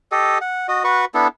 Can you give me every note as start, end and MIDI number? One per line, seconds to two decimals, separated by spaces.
0.12 0.38 67
0.12 0.38 69
0.12 0.38 75
0.41 0.67 78
0.68 0.83 66
0.68 0.83 75
0.84 1.05 66
0.84 1.05 71
0.84 1.05 85
1.14 1.28 59
1.14 1.28 62
1.14 1.28 64
1.14 1.28 69